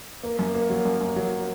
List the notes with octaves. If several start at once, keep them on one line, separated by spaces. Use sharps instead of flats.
A#3
F#2
A#3
F#3
F#2
F#2
F#3